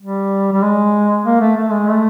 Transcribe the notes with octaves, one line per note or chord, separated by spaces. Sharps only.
G3
G3
G#3
A#3
A3
A3
G#3
A3